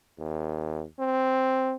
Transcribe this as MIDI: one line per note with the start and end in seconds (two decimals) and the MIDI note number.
0.18 0.84 39
0.99 1.75 60